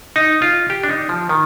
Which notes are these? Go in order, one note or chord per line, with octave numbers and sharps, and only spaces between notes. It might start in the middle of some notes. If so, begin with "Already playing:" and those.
D#4
F4
G4
D4
D#4
F3
D#3